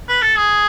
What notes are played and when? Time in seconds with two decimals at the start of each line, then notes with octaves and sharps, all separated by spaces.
0.08 B4
0.21 A4
0.36 G#4